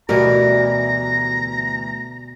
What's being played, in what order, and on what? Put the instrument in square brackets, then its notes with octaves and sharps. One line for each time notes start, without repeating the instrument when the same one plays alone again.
[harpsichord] D2 E3 [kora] B2 A#4 [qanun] G3 [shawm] A#5